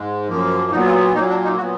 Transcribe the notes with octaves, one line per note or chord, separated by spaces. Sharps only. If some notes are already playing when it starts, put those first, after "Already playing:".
Already playing: G#2 G#3
F#2 F3 A#3
A#2 F#3 B3 D#4
F4
A#2 F#3 A#3 D#4
D4
D#4
A#2 F#3 B3 F#4